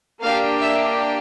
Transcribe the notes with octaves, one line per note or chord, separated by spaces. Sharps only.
A#3 D4 G4 F5
E5